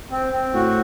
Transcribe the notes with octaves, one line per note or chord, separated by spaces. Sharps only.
C4
C4
A2 F#4